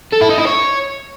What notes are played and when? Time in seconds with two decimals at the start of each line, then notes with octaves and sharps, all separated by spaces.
0.12 A4
0.21 E4
0.29 D#4
0.38 E4
0.47 C#5